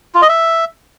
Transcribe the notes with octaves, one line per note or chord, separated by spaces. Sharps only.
F4
D#5
E5